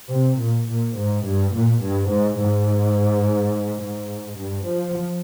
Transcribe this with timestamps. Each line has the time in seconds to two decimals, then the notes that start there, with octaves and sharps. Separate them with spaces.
0.12 C3
0.41 A#2
0.68 A#2
0.97 G#2
1.26 G2
1.53 A#2
1.82 G2
2.10 G#2
2.38 G#2
3.80 G#2
4.37 G2
4.65 F3